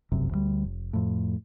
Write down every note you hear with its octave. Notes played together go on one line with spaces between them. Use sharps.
F1 B1 F#2 C3
D2 E3 G3
F1
F2 A2